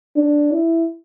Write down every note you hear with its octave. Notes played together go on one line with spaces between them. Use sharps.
D4
E4